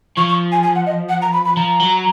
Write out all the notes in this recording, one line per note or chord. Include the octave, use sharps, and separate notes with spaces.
F3 C#6
C#6
G#5
G#5
F#5
D#5
F#5
A#5
B5
B5
F3 A#5
F#3